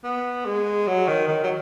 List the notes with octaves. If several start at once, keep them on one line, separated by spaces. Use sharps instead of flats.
B3
G#3
F#3
D#3
D#3
F#3